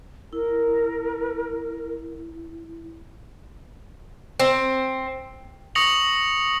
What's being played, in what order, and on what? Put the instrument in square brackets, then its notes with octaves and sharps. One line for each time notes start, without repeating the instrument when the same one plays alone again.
[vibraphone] E4 [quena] A#4
[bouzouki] C4
[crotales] C#6 D#6 A#6 C#7 F7 F#7